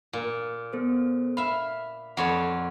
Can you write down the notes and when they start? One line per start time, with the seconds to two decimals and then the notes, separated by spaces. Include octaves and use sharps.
0.13 A#2
0.72 B3 A4 C5
1.37 E5 F5 B5
2.17 F2 C#5 D5 F#5 B5